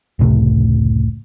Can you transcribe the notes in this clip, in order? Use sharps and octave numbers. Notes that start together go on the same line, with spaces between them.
F1 C#2 A2 C3